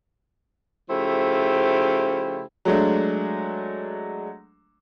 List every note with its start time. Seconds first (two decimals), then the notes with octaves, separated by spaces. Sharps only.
0.89 C#3 F3 A3 E4 G4 C5
2.65 F#3 G#3 A3 D4